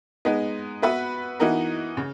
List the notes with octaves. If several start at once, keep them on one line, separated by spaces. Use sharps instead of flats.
G#3 B3 D#4
B3 F#4 B4 E5
E3 B3 D#4 F#4 A#4
C#3